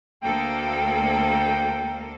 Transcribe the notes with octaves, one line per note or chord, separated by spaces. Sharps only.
D2 A#3 A4 G5